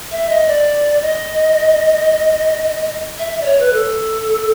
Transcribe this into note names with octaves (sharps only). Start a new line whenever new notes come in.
E5
D#5
D5
D#5
E5
E5
D5
C#5
B4
A4